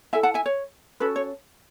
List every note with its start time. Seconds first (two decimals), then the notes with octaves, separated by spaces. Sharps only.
0.13 E4 A4 E5 G#5
0.23 F#5 A5
0.34 E5 G#5
0.46 C#5
1.00 C#4 F#4 A4 B4
1.16 C#5